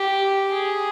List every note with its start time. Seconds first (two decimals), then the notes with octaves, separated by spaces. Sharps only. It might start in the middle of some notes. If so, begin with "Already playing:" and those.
Already playing: G4
0.53 G#4